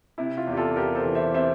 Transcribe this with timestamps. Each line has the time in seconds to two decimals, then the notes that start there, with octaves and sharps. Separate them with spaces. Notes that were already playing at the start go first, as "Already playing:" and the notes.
0.18 C3 E4
0.37 F4
0.47 E2
0.52 G4
0.57 F4 A4
0.76 E2 G4 A#4
0.95 A4 C5
1.05 E3
1.15 C5 E5
1.34 C3 C5 E5